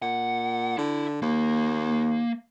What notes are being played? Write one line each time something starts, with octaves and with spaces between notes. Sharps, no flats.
A#2 F#5
D3 E4
D#2 A#3